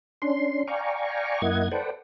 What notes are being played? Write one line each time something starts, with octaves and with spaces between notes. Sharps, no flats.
C#4 D4 C6
D5 F5 G5 G#5 A#5 C#6
F#2 A#3 E4 D#5 F#5 G#6
A4 B4 C5 D5 F#5 G5